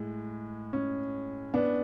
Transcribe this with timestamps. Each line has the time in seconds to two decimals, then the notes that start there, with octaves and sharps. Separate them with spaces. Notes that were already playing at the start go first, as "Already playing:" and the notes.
Already playing: A2 G#3
0.73 C#4
1.54 B3 D4